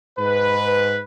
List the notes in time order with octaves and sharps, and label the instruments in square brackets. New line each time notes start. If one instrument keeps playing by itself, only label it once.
[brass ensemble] G#2 B4